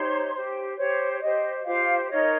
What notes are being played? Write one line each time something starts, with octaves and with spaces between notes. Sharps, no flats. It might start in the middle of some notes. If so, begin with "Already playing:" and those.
Already playing: D#4 G4 C5 C#5 C6
G4 C5
G4 C5 C#5
C#5
G4 C5 D#5
F4 G4 C5 F5
D#4 A#4 C#5 D#5